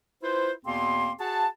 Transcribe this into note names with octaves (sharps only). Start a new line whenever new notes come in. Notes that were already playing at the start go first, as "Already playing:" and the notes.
E4 F4 B4 C5
E2 B2 A#3 C4 C6
F#4 G#4 F#5 A5